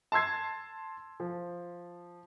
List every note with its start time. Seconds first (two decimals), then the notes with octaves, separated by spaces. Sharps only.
0.12 A5 C6 E6 G#6 C7
1.20 F3